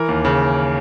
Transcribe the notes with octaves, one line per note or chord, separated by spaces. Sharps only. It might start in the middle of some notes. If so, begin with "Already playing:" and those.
Already playing: E3 A#4
D#2
C#3